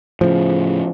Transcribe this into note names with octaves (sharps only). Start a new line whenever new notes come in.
A2 C#3 F3